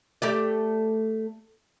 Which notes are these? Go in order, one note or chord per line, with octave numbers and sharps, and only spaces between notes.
A3 G4 D5